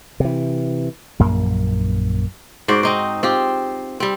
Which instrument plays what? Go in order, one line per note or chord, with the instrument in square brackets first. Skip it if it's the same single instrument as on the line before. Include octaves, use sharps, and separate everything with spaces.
[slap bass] C3 E3
A#1 F#2 A#3
[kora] G#2 F#4 C5 D5
C4 D#4 C5
C4 F4 G4
G3 C4